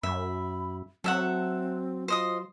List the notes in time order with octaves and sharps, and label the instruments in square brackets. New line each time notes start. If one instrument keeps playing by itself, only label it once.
[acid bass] F#2 [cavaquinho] E5 [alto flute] B5
[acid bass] F#3 [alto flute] C4 [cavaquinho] A4 E5 F#5
[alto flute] F4 [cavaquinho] C5 D#5 D#6